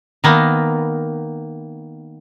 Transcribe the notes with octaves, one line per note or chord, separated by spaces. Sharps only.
D#3 A#3 B3